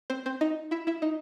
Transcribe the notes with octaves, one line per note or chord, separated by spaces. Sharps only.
C4 C5
C4 C5
D#4 D#5
E4 E5
E4 E5
D#4 D#5